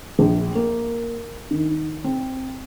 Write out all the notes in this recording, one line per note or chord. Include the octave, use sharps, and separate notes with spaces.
A#1
A#3
D#3
C4